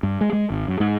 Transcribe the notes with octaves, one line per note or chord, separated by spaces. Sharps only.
G2
G#3
G#3
G#1
F#2
G#2